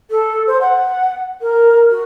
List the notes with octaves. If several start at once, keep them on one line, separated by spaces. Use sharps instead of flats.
A4
C5
F#5
A#4
F#4